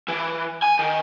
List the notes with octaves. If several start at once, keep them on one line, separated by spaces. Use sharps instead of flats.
E3
G#5
D#3